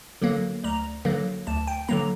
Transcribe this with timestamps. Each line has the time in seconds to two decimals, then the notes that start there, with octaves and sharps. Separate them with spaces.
0.22 D3 F#3 A#3
0.64 D2 A#5
1.05 D3 F#3 A#3
1.47 D2 A5
1.67 G5
1.88 D3 F#3 A#3 A#5